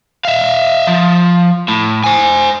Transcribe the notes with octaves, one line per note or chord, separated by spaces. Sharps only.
E5 F5
F3
A2
C5 G#5